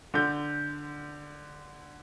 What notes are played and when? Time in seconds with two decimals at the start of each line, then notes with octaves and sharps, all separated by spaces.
0.14 D3 G6